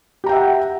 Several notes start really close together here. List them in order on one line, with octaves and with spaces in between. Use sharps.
G4 A#5 G5 E5 F#5